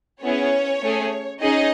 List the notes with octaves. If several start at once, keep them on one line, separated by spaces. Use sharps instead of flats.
B3 C#4 E4 G#4 C#5
A3 C#4 G#4
C#4 D#4 G#4 D#5